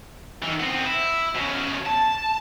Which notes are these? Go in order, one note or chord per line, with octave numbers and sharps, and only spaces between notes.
D#3 E3
B3 C4
E4
B2 C#4
A5